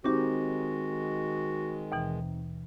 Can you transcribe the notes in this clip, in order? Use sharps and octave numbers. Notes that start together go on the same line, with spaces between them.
D#3 G#3 C4 D#4 F#4 G4 D6
D#2 B2 E3